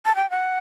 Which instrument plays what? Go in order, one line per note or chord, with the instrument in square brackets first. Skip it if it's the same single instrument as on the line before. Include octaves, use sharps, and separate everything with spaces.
[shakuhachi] A5
G5
F#5